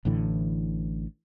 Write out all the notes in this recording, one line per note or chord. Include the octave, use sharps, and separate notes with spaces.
A1 A2 D3 E3